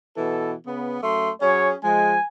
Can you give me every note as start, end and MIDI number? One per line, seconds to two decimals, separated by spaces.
0.16 0.54 47
0.16 0.54 52
0.16 0.54 69
0.67 0.99 49
0.67 0.99 59
1.02 1.30 42
1.02 1.30 57
1.02 1.30 84
1.42 1.75 54
1.42 1.75 61
1.42 1.75 68
1.42 1.69 73
1.84 2.16 53
1.84 2.16 56
1.84 2.24 80